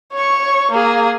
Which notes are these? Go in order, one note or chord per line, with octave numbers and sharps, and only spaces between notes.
C#5 C#6
A#3 G#4